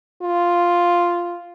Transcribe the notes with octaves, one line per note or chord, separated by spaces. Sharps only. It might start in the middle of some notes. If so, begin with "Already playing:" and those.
F4